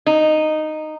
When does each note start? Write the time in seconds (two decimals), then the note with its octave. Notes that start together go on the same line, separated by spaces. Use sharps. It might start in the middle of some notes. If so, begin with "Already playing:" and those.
0.06 D#4